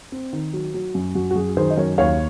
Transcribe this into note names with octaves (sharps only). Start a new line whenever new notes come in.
C4
D#3
F#3
F#3
F#2
F#2 F#4
F#4
F#2 G#4
D#3 G#4 C5
D#5
F#2 A#4 C#5
D#2 C#5 F5